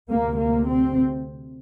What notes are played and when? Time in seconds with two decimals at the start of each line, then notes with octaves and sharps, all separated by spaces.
0.09 D2 C3 A#3
0.38 A#3
0.67 C4